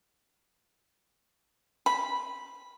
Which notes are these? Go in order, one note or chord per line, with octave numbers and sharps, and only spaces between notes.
B5